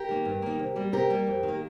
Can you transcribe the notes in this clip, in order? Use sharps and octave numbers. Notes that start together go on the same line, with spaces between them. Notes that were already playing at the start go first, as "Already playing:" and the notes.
Already playing: G4 A#4
D#3 A#3
G2
D#3 A#3
C3
G3 A#3
C3 G4 A#4
G3 A#3
F2
D#3 A#3